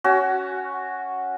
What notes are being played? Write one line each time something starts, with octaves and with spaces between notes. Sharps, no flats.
C#4 F#4